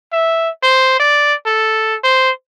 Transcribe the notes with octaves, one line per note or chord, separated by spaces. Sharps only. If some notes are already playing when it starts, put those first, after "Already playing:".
E5
C5
D5
A4
C5